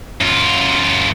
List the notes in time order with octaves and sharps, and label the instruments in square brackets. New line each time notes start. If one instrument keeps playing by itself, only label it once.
[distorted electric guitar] F#2 F4